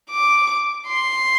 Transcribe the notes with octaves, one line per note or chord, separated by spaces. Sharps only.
D6
C6